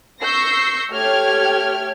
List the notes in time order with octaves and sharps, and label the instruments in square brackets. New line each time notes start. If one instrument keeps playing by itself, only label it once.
[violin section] C#6 E6 G6 A#6 C7
A3 G4 C#5 G5 F6 G#6